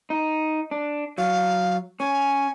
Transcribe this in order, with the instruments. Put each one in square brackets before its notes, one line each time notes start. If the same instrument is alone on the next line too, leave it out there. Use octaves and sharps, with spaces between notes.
[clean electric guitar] D#4
D4
[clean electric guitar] F#3 [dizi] F5
[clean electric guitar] C#4 [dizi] G#5